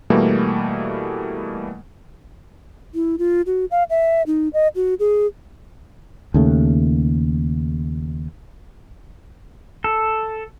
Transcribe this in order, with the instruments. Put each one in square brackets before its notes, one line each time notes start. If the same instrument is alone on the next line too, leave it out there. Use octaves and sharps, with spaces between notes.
[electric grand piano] B2 E3 G3 A3 A#3
[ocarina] E4
F4
F#4
F5
E5
D#4
D#5
F#4
G#4
[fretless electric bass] D#2 C#3 A3
[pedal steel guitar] A4